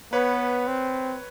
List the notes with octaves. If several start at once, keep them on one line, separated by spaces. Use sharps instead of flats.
B3 B4 C#5
C4